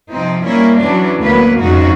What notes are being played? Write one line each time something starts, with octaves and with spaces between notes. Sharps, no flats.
C3 F3 C4 D#4
G3 A#3 C#4 E4
E3 F#3 C#4 D4
D2 F#3 A#3 B3 B4
F2 G#2 C#3 D#4 F#4